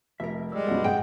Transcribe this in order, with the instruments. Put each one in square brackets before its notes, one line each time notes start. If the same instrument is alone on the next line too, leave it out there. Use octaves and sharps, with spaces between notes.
[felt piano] F1 [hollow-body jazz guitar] A#4 E5
[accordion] G3 G#3 [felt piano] E6
[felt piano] B1 F#2 B2 [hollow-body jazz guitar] F#4
[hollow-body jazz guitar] G#2 [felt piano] G#4 F#5 [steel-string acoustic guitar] G5